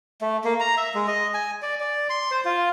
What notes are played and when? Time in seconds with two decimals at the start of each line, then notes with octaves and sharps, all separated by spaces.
0.21 A3
0.44 A#3
0.60 A#5
0.77 E5
0.94 G#3
1.08 D#5
1.34 G#5
1.62 D5
1.80 D5
2.10 C6
2.31 C5
2.45 F4